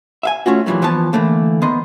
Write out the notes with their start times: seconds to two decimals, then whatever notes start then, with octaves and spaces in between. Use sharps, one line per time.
0.23 E5 F5 G#5
0.46 A3 C#4 F4 F#4
0.66 F2 A#2 D#3 E3 F#3 G3
0.82 E3 F3 B3 C#5 A5
1.13 D3 E3 A3 A#3
1.62 D#3 B3 D#5 C6